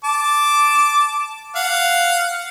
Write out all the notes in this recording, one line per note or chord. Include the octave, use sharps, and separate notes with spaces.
A5 D6
F5 F#5